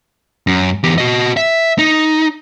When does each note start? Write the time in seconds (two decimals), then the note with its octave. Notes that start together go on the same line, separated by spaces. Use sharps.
0.47 F#2
0.83 E2 G4
0.98 F#4 D#5
1.37 E5
1.79 D#4